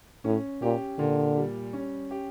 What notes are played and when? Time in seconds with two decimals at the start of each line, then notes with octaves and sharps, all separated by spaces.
0.24 A2 C#4
0.62 A#2 G4
0.99 A#2 D3
1.37 G3
1.73 C#4
2.11 G4